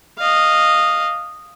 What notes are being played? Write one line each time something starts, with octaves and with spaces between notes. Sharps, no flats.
D#5 F5